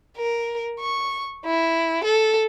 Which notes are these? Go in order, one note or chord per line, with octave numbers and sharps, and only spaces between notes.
A#4
C#6
E4
A4